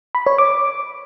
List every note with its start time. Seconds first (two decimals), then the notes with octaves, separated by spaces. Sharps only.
0.15 B5
0.27 C#5
0.38 D6